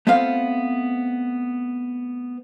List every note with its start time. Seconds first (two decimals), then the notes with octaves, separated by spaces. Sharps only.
0.07 A3 B3 C4 F4 F5